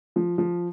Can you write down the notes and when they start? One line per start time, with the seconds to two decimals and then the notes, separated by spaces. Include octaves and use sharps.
0.16 F3
0.38 F3